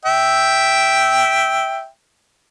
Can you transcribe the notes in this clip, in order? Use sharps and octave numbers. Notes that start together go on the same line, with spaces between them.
E5 G5